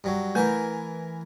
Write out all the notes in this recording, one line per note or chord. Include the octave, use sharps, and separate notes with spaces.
G2 F#3
E3 A3 A#4 B4 G#5